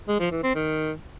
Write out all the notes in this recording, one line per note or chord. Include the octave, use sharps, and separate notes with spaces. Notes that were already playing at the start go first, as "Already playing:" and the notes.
G#3
F3
E3
C4
D#3